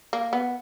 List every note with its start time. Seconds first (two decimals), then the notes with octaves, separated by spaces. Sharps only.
0.13 A#3
0.33 B3